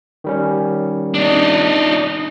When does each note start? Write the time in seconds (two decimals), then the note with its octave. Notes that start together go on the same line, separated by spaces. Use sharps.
0.24 D#3 G3 C#4
1.14 D4 D#4